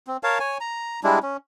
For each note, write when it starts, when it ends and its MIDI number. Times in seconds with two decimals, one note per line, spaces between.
0.07 0.17 60
0.23 0.39 70
0.23 0.39 73
0.23 0.39 77
0.23 0.39 81
0.40 0.58 73
0.40 0.58 80
0.61 1.00 82
1.04 1.19 55
1.04 1.19 56
1.04 1.19 62
1.04 1.19 64
1.23 1.37 61